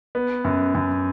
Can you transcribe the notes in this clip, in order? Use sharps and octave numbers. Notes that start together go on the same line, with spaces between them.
B3
F#2
F#2